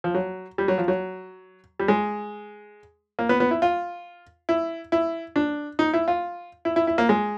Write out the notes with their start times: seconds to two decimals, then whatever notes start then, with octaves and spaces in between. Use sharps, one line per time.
0.04 F3
0.15 F#3
0.58 G3
0.68 F#3
0.78 F3
0.88 F#3
1.80 G3
1.88 G#3
3.19 A#3
3.29 B3
3.40 B3
3.51 E4
3.62 F4
4.49 E4
4.92 E4
5.36 D4
5.79 D#4
5.94 E4
6.08 F4
6.65 E4
6.76 E4
6.87 E4
6.98 A#3
7.09 G#3